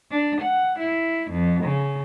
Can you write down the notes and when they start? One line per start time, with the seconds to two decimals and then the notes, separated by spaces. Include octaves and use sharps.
0.11 D4
0.42 F#5
0.80 E4
1.32 F2
1.64 C#3